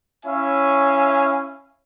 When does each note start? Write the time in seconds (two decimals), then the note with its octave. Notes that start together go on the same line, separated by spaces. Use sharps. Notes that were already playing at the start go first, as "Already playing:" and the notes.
0.26 C#4 E4 C#5 E5 F5 G#5